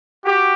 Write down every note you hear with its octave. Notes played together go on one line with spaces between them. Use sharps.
F#4 G4